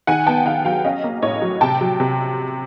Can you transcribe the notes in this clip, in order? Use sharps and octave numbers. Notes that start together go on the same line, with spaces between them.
D#3 F#5 G#5
B3 G5 A5
D#3 F5 G5
F#3 F5 G5
C#4 D#5 F5
A#3
A2 C#5 D#5
F#3
C3 G5 A5
F#3
C3